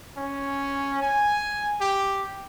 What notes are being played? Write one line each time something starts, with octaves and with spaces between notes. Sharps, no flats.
C#4
G#5
G4